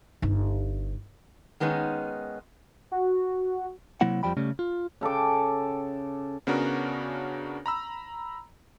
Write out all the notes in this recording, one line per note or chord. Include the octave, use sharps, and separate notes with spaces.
G1 D#4
D#3 G#3 B3 C#4 D#4
F#4
C3 F#3 A#3 E4 F#5
F2 F3 G3 G5 B5
C#3 G3 A3 C#4
F4
C#3 A4 G5 D6
C#3 B3 C#4 D4 F#4 A#4
A#5 B5 E6